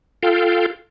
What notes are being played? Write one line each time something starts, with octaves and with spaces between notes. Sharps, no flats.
F4 A4 F5 G5